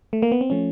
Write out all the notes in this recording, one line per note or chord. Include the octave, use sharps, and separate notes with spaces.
A3
A#3
B3
C4
F3 A3 C#4